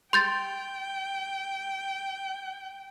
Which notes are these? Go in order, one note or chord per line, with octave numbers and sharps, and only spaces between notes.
G5 C6 G6 A6